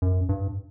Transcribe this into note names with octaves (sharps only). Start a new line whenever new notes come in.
F#2
G2